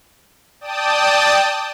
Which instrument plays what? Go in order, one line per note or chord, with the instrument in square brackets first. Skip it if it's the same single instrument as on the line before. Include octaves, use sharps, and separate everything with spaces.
[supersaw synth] D5 G5 A5 D#6